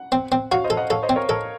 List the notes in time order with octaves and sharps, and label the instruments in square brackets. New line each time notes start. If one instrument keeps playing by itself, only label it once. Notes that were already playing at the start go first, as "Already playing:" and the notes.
Already playing: [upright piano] F#5
[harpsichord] C4
C4
[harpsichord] F#4 [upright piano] C#5 F5
[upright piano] C5 D#5
[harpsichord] A4
[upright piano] D#5 F#5
[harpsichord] A4 [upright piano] C#5 F5
[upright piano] C5 D#5
[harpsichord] C4
[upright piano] A#4 C#5
[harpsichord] A4 [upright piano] A#4 C#5